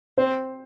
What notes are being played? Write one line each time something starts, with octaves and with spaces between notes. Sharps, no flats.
C4 C5